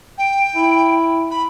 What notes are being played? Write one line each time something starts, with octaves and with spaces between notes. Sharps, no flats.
G5
E4
B5